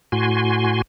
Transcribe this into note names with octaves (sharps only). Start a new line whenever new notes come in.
A2 F#4 G#5 C6